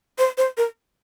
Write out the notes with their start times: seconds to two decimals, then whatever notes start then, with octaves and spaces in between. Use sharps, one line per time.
0.18 C5
0.38 C5
0.57 A#4